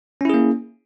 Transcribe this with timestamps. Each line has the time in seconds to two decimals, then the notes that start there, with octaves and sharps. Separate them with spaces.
0.21 C#4
0.25 E4
0.29 G#4
0.34 A#3